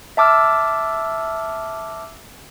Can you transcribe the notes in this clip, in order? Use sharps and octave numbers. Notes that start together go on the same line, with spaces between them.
E5 A5 D6 E6 F6